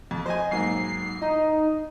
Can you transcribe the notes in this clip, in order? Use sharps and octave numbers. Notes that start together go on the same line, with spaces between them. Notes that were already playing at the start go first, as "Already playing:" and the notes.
F2
C5 D#5 G#5
B1 G#2 A#3 C7
D#4 D#5